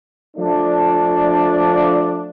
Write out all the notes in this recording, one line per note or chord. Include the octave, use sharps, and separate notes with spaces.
F3 A3 D4